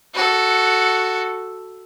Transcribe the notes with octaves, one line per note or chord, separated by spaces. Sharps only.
F#4 A4